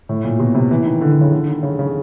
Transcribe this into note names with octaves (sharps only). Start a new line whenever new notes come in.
A2
A#2
B2
C3
E3
D#3
D3
D3
C#3
D3
D#3
C#3
C#3